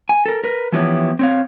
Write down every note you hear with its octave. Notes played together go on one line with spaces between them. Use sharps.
G#5
A4 A#4
A#4 B4
E3 F3 B3 E4 G4 C#5
C4 C#5 F5